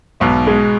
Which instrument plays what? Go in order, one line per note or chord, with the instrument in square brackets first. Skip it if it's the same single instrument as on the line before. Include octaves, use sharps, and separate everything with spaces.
[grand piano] B1 [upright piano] G#2 B2
[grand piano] G#3